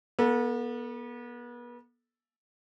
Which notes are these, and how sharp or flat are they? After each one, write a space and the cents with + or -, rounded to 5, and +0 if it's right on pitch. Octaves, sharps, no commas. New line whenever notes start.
B3 -35 A4 +0